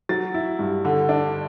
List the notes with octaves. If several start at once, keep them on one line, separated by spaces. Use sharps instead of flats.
F#3 A6
E4
G2
D3
D4